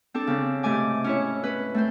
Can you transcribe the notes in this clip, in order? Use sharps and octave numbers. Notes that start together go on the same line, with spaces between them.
C4 D4 A4
C#3 C4
G#2 C3 A3 G#5 D6
C#4 E4 C#5
C#4 B4
A3 C4 C5